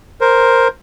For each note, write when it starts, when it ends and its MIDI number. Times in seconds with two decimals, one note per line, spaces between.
0.21 0.68 70
0.21 0.68 72